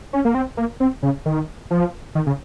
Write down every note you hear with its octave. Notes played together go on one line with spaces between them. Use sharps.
C#4
A#3
C4
A#3
C4
C#3
D#3
F3
D#3
C#3